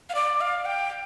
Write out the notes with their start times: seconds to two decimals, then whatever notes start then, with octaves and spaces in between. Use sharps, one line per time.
0.09 F5
0.15 D5
0.41 F5
0.65 G5